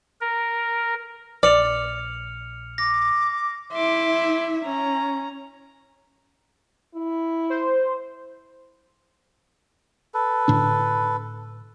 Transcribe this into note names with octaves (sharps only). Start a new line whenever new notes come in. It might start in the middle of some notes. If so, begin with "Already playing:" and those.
A#4
A#1 D5 F6 C#7 F7
D6 A#6
E4 E5 C6 D6
C#4 A#5
E4
C5
A4 B4
A2 D3 D4